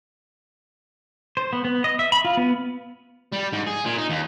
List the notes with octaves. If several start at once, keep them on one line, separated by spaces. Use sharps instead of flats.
C5
B3
B3
D#5
E5
B5
F4
B3
G3
G#2
G#4
A#2
D#4
D#2